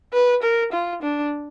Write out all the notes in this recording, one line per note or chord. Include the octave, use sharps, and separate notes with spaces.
B4
A#4
F4
D4